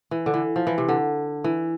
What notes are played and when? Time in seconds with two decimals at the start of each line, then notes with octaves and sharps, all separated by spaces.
0.11 E3
0.26 D3
0.34 E3
0.56 F3
0.67 E3
0.78 C3
0.89 D3
1.44 E3